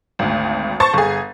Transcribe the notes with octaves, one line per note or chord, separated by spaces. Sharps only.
G#1 D2
C5 A5 C#6 A6
G1 G#4